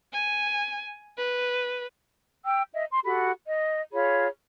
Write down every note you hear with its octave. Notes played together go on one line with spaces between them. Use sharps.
G#5
B4
G5 E6
D#5 E5
C6
F#4 G4 A4 B5
D#5
F4 G#4 C#5 B5